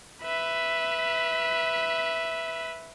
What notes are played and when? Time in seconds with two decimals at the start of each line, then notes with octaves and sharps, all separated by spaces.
0.23 B4 E5